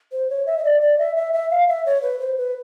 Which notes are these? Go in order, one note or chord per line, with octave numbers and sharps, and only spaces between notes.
C5
C#5
E5
D#5
D5
D5
E5
E5
E5
F5
E5
C#5
B4
C5
B4